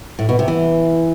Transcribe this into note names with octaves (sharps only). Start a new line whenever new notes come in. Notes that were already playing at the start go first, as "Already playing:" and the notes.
A2
B2
C3
E3